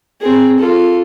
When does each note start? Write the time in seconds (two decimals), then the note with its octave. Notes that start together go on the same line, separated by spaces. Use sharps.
0.21 C4 G#4
0.58 F4 A4